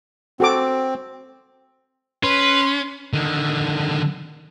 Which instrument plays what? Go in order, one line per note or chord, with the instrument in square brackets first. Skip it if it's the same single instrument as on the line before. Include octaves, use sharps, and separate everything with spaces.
[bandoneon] C4 [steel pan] F#4 A4 D6
[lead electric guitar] C#4 [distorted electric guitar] B4 [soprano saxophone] C6
[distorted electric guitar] D3 D#3